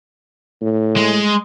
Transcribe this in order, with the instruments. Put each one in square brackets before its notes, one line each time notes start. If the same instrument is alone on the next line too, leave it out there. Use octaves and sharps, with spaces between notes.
[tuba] A2
[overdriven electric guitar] G#3